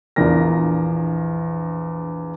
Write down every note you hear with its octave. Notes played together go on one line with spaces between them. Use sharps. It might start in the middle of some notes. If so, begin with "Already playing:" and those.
A#1 E2 D4 F4 A#4 A#6